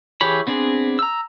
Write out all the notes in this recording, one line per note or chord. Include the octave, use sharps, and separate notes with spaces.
E3 G4 G#4 C#5 B5
B3 C4 D4 G#4
A#5 E6